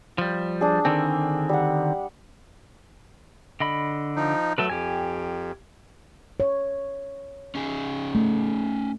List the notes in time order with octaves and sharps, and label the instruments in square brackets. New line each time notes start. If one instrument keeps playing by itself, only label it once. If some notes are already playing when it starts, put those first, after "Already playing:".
[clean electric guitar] F3 G3
[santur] D4 G#4
[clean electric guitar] D3 D#3 C4 [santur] G#5
[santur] G3 F#5
[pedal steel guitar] D3 D#5 B5
[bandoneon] F3 D#4
[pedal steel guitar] F#3 A4 B4 [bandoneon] A3
[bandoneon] F2 [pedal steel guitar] G4 G#5
[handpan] C#5
[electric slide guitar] C#4 D#4 G#4
[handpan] A3